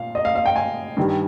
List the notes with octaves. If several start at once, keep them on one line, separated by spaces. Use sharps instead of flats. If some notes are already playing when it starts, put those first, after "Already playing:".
Already playing: A#2 F5
D#5
F5
F5
G5
G#5
G2 D#3 G3